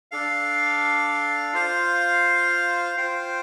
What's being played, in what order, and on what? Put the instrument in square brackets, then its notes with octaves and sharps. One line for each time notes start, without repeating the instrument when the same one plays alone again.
[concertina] D4 A4 F5
F4 C5 F5
F4 C5 G5